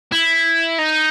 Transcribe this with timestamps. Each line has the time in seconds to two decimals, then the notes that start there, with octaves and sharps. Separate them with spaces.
0.12 E4
0.79 D#4